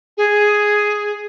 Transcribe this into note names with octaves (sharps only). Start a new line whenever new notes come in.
G#4